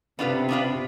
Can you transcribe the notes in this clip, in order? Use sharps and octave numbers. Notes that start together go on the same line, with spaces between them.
C3 B3 D4 F4 B4
B3 D4 F4 B4